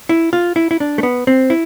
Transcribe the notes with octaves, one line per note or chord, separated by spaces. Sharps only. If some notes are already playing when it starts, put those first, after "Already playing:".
E4
F4
E4
E4
D4
A3
B3
C4
E4